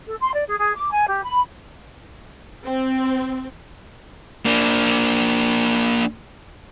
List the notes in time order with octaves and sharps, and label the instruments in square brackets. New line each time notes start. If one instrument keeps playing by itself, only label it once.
[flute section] A4
C6
D5
G#4
G#4
D6
G#5
G4
B5
[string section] C4
[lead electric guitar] A#3 D4